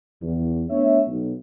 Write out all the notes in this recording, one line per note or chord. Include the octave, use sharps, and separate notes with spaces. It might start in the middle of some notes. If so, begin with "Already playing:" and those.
E2
A3 B3 D4 C#5 E5
B1